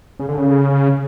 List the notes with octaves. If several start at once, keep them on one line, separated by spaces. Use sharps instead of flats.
C#3
D3
C#3